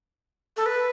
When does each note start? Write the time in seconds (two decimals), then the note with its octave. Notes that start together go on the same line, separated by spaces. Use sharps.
0.57 A4
0.66 B4